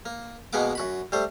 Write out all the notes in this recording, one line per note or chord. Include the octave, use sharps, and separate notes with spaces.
A#3
B2 G#3 A#3 B3 F#5 D6
F#2 F#4 B5
G3 A3 C5